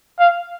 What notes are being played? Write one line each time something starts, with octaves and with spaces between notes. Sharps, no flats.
F5